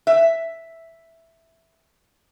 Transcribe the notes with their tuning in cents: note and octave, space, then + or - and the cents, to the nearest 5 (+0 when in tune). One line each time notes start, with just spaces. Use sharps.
E5 +0